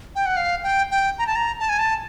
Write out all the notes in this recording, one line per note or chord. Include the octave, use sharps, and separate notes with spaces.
G5
F#5
F5
G5
G5
A#5
A5
A#5
A5
G#5
A5